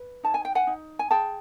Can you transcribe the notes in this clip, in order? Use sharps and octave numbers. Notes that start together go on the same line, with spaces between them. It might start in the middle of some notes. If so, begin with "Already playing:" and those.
Already playing: B4
D#4 A5
G#5
G5
F#5 G#5
D#4
G#5
G#4 G5 A5